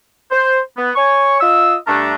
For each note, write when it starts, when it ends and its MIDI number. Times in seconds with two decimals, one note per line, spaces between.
0.31 0.59 72
0.77 0.91 59
0.96 1.37 73
0.96 1.37 80
0.96 1.37 85
1.41 1.75 65
1.41 1.75 75
1.41 1.75 88
1.87 2.15 43
1.87 2.15 57
1.87 2.15 62
1.87 2.15 82